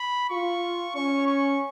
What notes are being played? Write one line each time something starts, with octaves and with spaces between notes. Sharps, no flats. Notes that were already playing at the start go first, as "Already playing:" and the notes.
Already playing: B5
F4 C#6
C#4 C#6
C#6